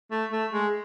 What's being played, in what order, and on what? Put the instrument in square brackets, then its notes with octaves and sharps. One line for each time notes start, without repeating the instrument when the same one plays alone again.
[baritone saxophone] A3
A3
G#3